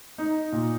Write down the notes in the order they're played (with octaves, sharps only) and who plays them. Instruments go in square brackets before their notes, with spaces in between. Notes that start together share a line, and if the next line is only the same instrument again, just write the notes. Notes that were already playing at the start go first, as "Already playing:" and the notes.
[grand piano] D#4
A#2